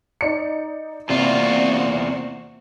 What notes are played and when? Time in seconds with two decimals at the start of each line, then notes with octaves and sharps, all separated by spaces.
0.21 D#4 D5 C#7
1.09 E2 C3 A#3 F4 F#4 C5 D5